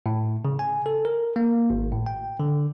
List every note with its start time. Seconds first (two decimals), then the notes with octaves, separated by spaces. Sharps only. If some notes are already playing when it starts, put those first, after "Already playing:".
0.06 A2
0.45 C#3
0.59 G#5
0.86 A4
1.05 A#4
1.36 A#3
1.70 G#1
1.92 A2
2.06 G5
2.40 D3